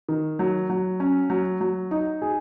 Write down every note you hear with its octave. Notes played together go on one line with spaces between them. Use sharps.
D#3
F#3
F#3
C#4
F#3
F#3
D#4
G#4